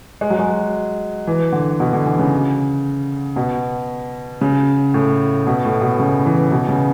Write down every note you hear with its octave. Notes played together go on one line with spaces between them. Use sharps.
G#3
F#3
G#3
E3
D3
B2
D3
E3
C#3
B2
C#3
A2
B2
A2
B2
C#3
E3
B2
C#3